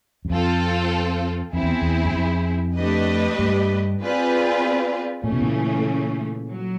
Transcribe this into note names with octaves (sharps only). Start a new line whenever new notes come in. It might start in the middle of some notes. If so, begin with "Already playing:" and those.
F#2
F2 C4 F4 A4
F2 C4 E4 G#4
E2
E2
F#2
F2
A3 D4 G4 B4 D#5
G2
C4 F4 G#4 B4 D5
A#2 C#3 E3 A3 C#4
B2
A#2
F#3